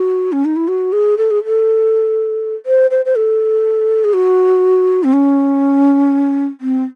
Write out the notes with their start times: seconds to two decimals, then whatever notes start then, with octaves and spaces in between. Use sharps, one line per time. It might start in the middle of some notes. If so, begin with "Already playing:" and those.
Already playing: F#4
0.32 C#4
0.45 D#4
0.56 E4
0.68 F#4
0.93 G#4
1.18 A4
1.31 G#4
1.45 A4
2.66 C5
2.91 C5
3.05 C5
3.16 A4
4.04 G#4
4.14 F#4
5.04 C4
5.13 C#4
6.61 C4